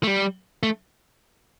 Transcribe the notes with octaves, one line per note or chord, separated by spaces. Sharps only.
A3
G3
A3